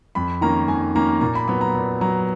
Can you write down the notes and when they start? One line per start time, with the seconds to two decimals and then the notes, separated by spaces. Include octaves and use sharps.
0.15 F2 B5
0.41 D#3 A#3 C#4 A#5
0.68 F2 G#5
0.95 D#3 A#3 C#4 A#5
1.21 A#2 A#5
1.35 B5
1.48 F#3 B3 B5
1.61 A#5
1.74 A#2
2.01 F#3 B3 A#5